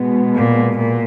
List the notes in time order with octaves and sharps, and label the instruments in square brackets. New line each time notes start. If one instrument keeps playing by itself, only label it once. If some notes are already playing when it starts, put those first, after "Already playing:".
Already playing: [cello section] B2 G#3 B3
[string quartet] A#2
A#2